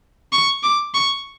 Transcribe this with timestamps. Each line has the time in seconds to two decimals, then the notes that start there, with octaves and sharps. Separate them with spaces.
0.33 C#6
0.63 D6
0.94 C#6